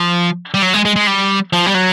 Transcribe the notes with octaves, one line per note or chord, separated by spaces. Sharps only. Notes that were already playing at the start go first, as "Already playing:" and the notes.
Already playing: F3
G3
F#3
G#3
G#3
G#3
G3
F3
G3
F#3